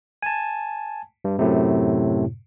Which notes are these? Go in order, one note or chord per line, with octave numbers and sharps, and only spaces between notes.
G#5 A5
G2
F#2 A2 C3